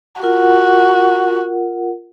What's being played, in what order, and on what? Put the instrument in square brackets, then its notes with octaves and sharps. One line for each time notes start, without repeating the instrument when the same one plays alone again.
[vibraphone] F4 A#4 F#5 [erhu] F#4